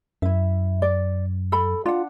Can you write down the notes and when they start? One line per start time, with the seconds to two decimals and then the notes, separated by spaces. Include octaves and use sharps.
0.22 F#2 E4 E5
0.82 D5
1.52 A4 B5
1.86 D4 F4 F#5